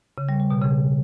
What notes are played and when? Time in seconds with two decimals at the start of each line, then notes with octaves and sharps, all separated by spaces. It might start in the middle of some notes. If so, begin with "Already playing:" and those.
0.18 C#3
0.29 G3
0.40 G3
0.50 B2
0.61 C#3